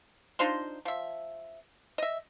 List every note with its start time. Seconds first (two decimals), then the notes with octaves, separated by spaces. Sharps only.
0.39 D4 D#4 F4 C5
0.85 F3 E5
1.98 D#5 E5